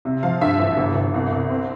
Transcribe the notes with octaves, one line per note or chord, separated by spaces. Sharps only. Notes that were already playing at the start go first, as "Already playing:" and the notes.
C3
F3 F5
G2 E5
A1
G1
G1
C2
C2
C4